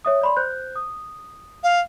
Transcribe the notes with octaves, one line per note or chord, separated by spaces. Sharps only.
C#5 E5 D#6
D5 B5 C6
C5 F#6 G6
D#6
F5